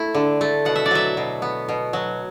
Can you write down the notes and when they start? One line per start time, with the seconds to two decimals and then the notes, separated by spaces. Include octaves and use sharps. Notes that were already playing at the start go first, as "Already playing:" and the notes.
Already playing: A3 E4
0.15 D3
0.41 A3
0.65 B2 F#5
0.76 E5
0.86 D5
0.91 F#3 E5
1.17 B2
1.42 B3
1.69 B2
1.93 F#3